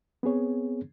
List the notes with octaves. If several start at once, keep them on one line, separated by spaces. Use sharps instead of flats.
B3 C4 G#4 C#5